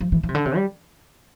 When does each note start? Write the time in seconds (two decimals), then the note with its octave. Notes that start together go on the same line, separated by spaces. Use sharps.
0.01 F3
0.12 E3
0.23 E3
0.29 C3
0.35 D3
0.45 C3
0.56 G3